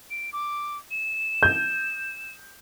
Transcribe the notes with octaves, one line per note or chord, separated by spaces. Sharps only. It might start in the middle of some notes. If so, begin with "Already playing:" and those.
D7
D6
E7
G6